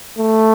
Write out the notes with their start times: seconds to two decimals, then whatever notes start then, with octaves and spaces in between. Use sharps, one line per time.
0.19 A3